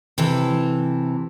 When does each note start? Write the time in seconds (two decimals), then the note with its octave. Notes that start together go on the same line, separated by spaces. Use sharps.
0.18 C3 E3 A4